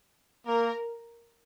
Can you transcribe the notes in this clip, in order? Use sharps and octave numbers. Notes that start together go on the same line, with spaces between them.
A#3 A#4